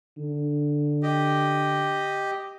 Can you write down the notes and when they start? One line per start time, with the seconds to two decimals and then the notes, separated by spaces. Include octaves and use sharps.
0.17 D3
1.03 G4 D#5